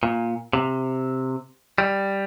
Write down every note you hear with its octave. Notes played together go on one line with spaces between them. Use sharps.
A#2
C3
G3